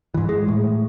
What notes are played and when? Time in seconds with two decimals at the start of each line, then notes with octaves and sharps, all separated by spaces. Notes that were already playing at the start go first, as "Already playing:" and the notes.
0.14 G#2 E3
0.29 G#3
0.48 A2